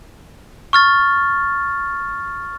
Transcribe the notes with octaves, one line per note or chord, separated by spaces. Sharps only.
C#6 F6 A6